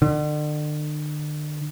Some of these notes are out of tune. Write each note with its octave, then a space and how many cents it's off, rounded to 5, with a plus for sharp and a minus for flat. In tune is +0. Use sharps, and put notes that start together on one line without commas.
D3 +40